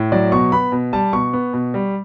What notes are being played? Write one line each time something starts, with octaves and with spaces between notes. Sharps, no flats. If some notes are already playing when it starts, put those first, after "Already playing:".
Already playing: A2
F#3 D5
B2 C#6
B3 B5
B2
G3 A5
B2 C#6
B3
B2
G3